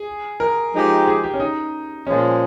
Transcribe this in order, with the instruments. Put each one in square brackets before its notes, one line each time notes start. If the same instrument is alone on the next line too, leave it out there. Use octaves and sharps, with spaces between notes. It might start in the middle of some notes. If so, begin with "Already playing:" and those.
Already playing: [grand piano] G#4
A#4
[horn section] F3 G#3 D#4 G4
[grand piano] G#4
G4
C#4
D#4
[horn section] A#2 F3 G#3 [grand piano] C#4